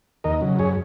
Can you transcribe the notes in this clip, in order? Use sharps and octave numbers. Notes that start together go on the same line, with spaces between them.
D#2 A#4 D#5
C#3 F#3
F#2 G#4 C#5